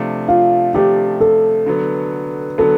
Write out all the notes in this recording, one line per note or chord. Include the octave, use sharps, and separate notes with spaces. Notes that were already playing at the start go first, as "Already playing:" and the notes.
Already playing: C3 F3 A3 D4
F4
C3 F3 A3 D4 G4
A4
D3 F#3 B3
D3 F#3 B3 A4